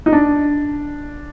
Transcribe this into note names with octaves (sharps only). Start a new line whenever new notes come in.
D#4
D4